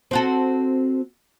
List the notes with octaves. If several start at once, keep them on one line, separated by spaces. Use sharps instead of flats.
C4 F#4 A4